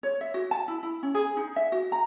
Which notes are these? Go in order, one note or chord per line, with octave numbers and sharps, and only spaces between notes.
C#5
E5
F#4
A5
E4
E4
C#4
G#4
D#4
E5
F#4
A#5